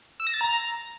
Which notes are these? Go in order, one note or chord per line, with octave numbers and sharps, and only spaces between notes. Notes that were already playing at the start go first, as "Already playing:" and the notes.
E6
A#6
A6
A#5